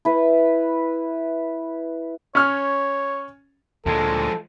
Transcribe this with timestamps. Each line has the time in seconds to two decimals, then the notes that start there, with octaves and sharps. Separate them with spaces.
0.05 E4 B4
2.35 C#4 C#5 F6
3.86 D2 A#2 F3 G#3 A4